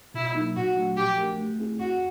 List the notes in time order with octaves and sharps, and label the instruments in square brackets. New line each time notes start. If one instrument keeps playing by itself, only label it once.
[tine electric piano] B2 [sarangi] E4
[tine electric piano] F#3 A#3 D#4
[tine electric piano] A#2 [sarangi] F#4
[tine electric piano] F#3 A3 D4 F#4
[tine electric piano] F3 [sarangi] G4
[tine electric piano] A3 D4 G4 A#4
A3
C4 E4 G#4
[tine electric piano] F2 [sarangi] F#4